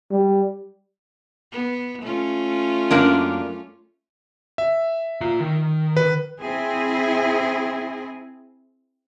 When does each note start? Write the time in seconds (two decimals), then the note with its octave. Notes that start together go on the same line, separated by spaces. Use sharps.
0.11 G3
1.52 B3
2.02 A3 C#4 F4
2.91 F#2 A#3 D4
4.58 E5
5.21 F4 A#5
5.40 D#3
5.97 B4
6.38 C4 E4 G#4